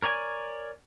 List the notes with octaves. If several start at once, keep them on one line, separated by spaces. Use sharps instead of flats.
A#4 C#5 D5 G#5